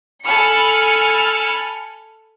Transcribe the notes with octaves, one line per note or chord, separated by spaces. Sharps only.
A4 G#5 B5 F6 C#7